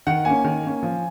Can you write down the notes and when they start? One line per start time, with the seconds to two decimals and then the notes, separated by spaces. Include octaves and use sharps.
0.07 D#3 F#5
0.25 A#3 C#4 G#5
0.44 D#3
0.64 A#3 C#4
0.83 F3